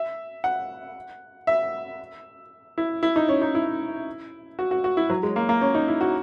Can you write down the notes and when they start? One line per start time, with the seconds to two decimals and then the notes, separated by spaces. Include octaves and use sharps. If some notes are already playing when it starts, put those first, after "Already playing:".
Already playing: E5
0.44 F#5
1.47 E5
2.78 E4
3.03 E4
3.16 D#4
3.29 C#4
3.42 D#4
3.55 E4
4.59 F#4
4.71 F#4
4.84 F#4
4.97 E4
5.10 F#3
5.23 G#3
5.36 A#3
5.49 A#3
5.61 C#4
5.75 D#4
5.88 E4
6.01 F#4